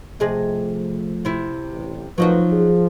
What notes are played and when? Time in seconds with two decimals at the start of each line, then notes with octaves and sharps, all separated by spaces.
0.20 C3 F3 A3 G#4 D#5
1.25 C3 E4
1.71 A1
2.18 F3 F#3 A3 D#4 F#4 A#4 B4
2.52 G#4